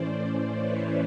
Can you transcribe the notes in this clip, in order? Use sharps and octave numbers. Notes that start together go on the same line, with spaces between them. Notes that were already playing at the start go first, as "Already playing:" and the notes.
Already playing: A2 E3 A3 C#4 C5 D5
B4 C#5